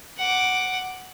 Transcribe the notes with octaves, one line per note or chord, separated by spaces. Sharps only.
F#5 D6